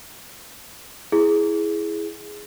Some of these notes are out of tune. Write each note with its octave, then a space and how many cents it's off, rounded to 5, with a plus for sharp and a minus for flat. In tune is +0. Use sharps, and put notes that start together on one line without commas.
E4 +0 G#4 +5